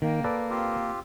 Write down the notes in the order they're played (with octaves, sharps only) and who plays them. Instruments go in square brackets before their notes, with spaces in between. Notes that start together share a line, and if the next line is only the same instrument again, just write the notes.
[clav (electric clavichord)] D#3 [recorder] A#3 [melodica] G5
[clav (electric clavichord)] A4 B4 D5
[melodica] C4 F4 G4